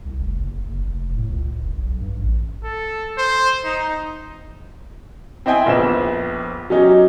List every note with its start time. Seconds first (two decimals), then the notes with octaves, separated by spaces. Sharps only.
0.05 C2
0.20 F1
0.40 F#1
0.63 F#1
0.87 F1
1.16 A2
1.29 C#2
1.60 E1
1.77 B1
2.01 G2
2.18 A1
2.64 A4
3.18 C5
3.65 D#4
5.46 C4 E4 D#5 G5 G#5
5.66 A#1 F2 B3 E7
6.70 F#3 C#4 D#4 G4